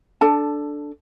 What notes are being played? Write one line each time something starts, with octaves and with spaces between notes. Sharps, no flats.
D4 A4 A5